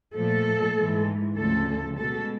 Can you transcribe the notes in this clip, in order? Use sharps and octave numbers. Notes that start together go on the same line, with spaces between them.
A#2 F3 A3 A4
G#2 E3 G#3
D2 C#3 F3 A3 A4
B2 G#3 A4